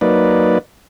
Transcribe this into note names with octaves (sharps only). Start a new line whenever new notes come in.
F#3 A#3 D#4 B4 D5